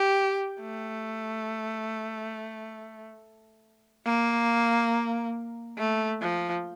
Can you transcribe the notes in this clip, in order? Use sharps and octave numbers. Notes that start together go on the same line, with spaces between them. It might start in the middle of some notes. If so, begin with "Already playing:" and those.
Already playing: G4
A3
A#3
A3
F3